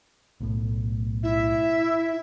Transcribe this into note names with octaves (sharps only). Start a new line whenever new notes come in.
B1 A2
E4 E5